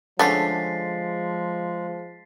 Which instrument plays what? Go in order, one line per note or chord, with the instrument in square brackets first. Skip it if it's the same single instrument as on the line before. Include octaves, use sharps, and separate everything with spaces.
[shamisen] D3 A3 C#4 [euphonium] F3 [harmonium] G#3 [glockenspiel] A6 B6 C7